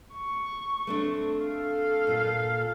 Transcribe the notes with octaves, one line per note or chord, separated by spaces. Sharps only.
C#6
A3 C4 D4
A4 F5
A#2 F4